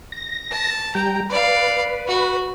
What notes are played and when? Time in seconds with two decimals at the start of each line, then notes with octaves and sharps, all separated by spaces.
0.12 A#6
0.51 A5
0.95 G3 G5 A#5
1.30 B4 D5 F5
2.08 F#4